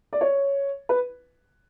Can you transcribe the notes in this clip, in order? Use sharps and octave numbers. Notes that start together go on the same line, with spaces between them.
D5
C#5
B4